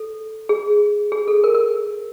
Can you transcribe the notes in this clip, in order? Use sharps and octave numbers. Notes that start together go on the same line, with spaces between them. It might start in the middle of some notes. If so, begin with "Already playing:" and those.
Already playing: A4
G#4
G#4
A4
A#4
A#4